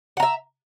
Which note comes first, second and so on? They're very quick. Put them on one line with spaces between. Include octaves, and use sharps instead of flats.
F#5 A#5 E5